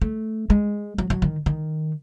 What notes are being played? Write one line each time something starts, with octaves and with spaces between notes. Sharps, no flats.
A3
G#3
F#3
F#3
D#3
D#3